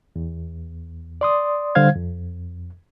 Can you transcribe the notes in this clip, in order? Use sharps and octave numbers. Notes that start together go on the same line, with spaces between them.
E2
D5 C6 D#6
D3 G3 C5 F5 G#6
F2